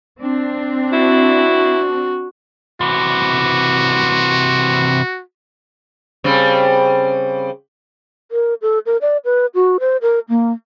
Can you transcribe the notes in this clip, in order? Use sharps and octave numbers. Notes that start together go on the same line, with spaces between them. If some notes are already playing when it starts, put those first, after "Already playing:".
C4 D4
E4 F#4
C3 E3 F#4
C#3 G3 C4
A#4
A4
A#4
D5
B4
F#4
C5
A#4
A#3